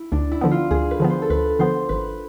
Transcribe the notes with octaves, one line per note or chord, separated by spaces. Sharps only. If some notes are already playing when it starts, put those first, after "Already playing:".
Already playing: E4
D2 D4
E4
D3 F3 B3
F4
D2 G#4
B4
D3 F3 B3
C5
A4
D2 B4
D3 F3 B3 C5
G#1 B4